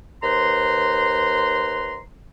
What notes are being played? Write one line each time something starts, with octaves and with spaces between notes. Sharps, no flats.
D#2 B4 C5 A#5 C6